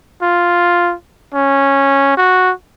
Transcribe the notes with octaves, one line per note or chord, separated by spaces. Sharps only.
F4
C#4
F#4